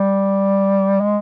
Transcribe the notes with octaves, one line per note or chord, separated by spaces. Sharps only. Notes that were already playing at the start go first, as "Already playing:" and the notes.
Already playing: G3
G#3